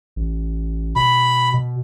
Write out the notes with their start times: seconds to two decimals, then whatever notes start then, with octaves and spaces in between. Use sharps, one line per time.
0.16 A1
0.96 B2 B5
1.54 B2